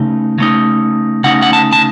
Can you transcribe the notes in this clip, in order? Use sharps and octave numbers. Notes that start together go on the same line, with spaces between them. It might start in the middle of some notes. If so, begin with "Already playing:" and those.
Already playing: C#3 A3 D#4
C#3 A3 D#4
C#3 A3 D#4 F#5
F#5
A5
A5